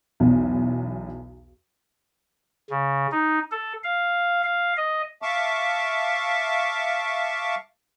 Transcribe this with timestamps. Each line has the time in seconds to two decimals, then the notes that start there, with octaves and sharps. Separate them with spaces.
0.20 B1 E2 B2
2.70 C#3
3.12 D#4
3.52 A4
3.83 F5
4.43 F5
4.77 D#5
5.22 E5 F5 A5 C#6 D6